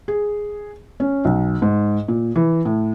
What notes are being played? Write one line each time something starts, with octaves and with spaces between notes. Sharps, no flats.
G#4
C#4
B1
G#2
A#2
E3
A2